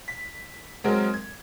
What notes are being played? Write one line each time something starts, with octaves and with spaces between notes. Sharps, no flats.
B6
F#3 G#3 C4 A#4
G#6